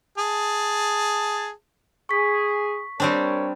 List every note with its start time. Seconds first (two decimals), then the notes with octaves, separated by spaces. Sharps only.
0.18 G#4 A5
2.09 G#4 C#6 B6
3.00 G3 C4 D4 A#4 C#5